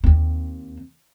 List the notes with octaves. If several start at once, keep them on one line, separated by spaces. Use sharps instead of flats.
D#2 C4